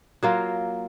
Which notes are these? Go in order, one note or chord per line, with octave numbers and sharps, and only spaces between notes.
F#3 A#3 F4